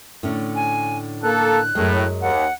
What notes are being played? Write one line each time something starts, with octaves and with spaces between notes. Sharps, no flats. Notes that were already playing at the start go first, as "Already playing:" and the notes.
A2 D3 C#4
G#5
A#3 A4 F#6
F#2 A2 G#3
D#2 F#5